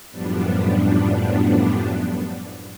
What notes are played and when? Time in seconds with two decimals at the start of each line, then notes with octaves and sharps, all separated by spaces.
0.11 F#2 A2 F3 G3 B3 D4